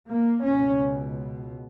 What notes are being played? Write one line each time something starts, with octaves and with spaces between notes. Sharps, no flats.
A#3
C#2 B2 C#4